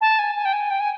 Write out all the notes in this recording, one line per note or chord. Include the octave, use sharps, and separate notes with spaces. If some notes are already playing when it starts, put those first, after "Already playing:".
A5
G#5
G#5
G5
G#5
G5
G#5